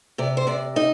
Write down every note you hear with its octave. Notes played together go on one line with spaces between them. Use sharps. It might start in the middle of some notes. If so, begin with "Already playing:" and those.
C3 D5
C5
C3 D5
D#4 D#5